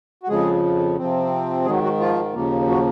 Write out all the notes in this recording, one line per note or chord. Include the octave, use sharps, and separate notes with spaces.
F#4
F2 C#3 F3 G#3 G#4
C3 F3 C4
G#2 D#3 F#3 G#3 G#4
F#3 F#4
F3 F4
D#2 C#3 F3 A#3
F#3 F#4